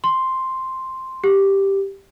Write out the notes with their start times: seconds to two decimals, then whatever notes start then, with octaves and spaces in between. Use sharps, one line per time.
0.04 C6
1.24 G4